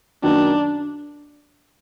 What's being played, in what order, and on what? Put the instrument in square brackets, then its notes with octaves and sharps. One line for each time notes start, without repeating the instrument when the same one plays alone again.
[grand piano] F#2 D#3 F#3 A#3 [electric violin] D4